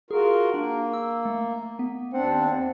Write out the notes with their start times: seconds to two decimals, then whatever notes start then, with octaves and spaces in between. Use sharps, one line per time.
0.11 F4 F#4 G#4 A#4
0.54 A#3 D4
0.93 E6
1.25 A3
1.79 B3
2.13 D#2 C4 D4 F#5